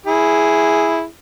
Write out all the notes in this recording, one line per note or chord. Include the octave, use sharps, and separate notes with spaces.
E4 G#4